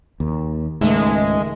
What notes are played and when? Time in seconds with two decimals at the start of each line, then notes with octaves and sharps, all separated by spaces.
0.20 D#2
0.81 C#2 G#2 D#3 G#3 A3 E5